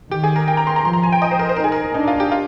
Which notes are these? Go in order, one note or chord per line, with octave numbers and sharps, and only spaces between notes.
D#3 G4
G#4
A#4
G5
A#5
C6
A#5
F3 C6
A#5
G#5
G5
D#5
C5
A#4
C5
D#4 A#4
G#4
A#4
D4 D#4
F4
G4
F4